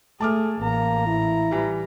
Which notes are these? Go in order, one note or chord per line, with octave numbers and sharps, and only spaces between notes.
A3 G#4 A5 D6 F6
A1 A#3 A#5
E4
E3 G3